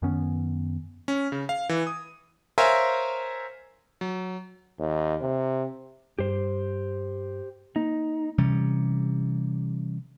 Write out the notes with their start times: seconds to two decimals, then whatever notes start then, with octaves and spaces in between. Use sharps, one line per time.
0.02 F#2 D#3 B3 C#4
1.08 C#4
1.32 C#3
1.49 F5
1.69 E3
1.87 D#6
2.58 A#4 C5 C#5 E5 F5 G#5
4.01 F#3
4.78 D#2
5.21 C3
6.19 G2 G4 C5
7.76 A#3 D#4
8.38 C3 E3 G3 C#4